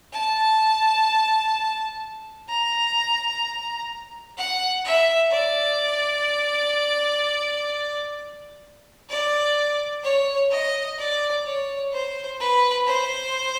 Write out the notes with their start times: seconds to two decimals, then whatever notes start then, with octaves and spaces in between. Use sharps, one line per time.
0.13 A5
2.49 A#5
4.38 F#5
4.85 E5
5.32 D5
9.09 D5
10.04 C#5
10.51 D#5
10.98 D5
11.45 C#5
11.93 C5
12.40 B4
12.87 C5